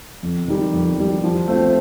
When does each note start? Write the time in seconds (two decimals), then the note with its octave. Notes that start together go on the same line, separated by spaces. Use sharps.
0.23 F2
0.48 D#3 G3
0.74 F2
0.98 D#3 G3
1.24 F3
1.48 A3 C4 F4 C5